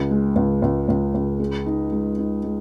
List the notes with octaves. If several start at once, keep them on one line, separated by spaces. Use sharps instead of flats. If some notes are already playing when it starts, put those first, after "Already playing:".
Already playing: C#2
G#3
C#2
C#2
C#2
C#2
G#3
D#4
G#3
D#4
G#3